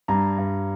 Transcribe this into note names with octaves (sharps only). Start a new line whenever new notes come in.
G2 A#5
G2